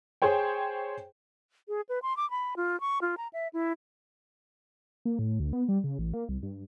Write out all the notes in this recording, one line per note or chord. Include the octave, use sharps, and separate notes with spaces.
G#4 C5 C#5 G5
G#4
B4
C6
D6
B5
F4
C#6
F4
A#5
E5
E4
A#3
A2
D2
B3
G3
C#3
A1
A#3
C2
G2